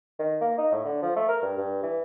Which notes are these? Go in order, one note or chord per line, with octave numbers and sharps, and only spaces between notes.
D#3
A#3
D#4
A2
D3
F3
A3
A#4
G2
G2
E3